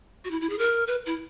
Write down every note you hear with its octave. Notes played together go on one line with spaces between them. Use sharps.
F#4
E4
E4
G#4
A#4
B4
E4